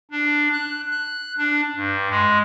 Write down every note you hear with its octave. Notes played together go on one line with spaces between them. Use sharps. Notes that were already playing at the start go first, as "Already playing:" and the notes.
D4
F#6
F#6
D4
G2
G#3